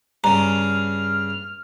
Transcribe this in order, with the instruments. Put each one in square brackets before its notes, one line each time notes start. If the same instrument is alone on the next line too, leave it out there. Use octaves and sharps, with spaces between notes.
[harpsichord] G2 C#3 [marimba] A#5 [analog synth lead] F6